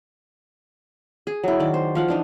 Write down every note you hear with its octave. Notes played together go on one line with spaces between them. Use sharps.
G#4
F#3 E4
D#3 D5
C5
F3 F5 F#5
E3 D4 D#4